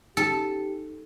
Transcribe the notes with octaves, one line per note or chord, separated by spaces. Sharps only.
D#4 G4 A4